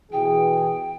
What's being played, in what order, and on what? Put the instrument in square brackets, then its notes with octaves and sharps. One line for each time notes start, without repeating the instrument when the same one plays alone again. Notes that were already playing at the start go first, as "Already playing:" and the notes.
[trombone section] B2 E3 G#4 [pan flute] G5